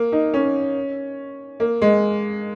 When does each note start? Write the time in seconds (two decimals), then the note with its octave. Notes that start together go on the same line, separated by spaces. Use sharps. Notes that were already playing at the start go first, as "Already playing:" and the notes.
Already playing: A#3
0.12 D#4
0.34 C#4
1.60 A#3
1.82 G#3